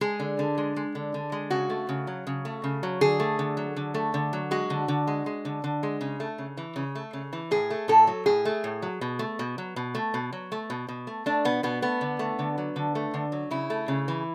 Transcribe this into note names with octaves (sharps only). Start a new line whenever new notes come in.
G#3 G#4
D3
D3
G#3
G#3
D3
D3
G#3
C#3 F#4
A3
C#3
F#3
C#3
A3
C#3
F#3
D3 G#4
A3
D3
F#3
D3
A3
D3
F#3
G#3 F#4
D3
D3
G#3
G#3
D3
D3
G#3
C#3
A3
C#3
E3
C#3
A3
C#3
E3
A2 G#4
A3
A2 A4
F#3
A2 G#4
A3
A2
F#3
B2
A3
B2
F#3
B2
A3
B2
F#3
A3
B2
B2
A3
A3 D4
B2 B3
B2 B3
A3 B3
D3
A3
D3
F#3
D3
A3
D3
F#3
C#3 E4
A3
C#3
E3